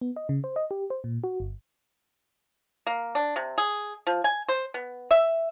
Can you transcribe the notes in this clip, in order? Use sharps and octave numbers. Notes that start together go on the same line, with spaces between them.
B3
D#5
C#3
C5
D#5
G4
C5
A#2
F#4
G1
A#3
D4
C3
G#4
F3
G#5
C5
B3
E5